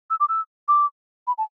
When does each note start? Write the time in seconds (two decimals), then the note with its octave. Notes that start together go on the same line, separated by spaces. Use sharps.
0.10 E6
0.20 D6
0.29 E6
0.68 D6
1.27 B5
1.38 A5